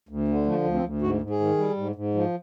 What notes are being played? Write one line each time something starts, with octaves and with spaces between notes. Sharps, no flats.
D2
D3
F3 A3
D2
C4
D2
G#2 F#4
G#2
G#4
D#3
G3
G#2
G#2
F3